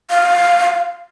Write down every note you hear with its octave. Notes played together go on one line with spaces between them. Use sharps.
F5